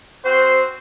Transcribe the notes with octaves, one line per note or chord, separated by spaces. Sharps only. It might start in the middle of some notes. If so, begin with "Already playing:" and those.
C4 F#4 C5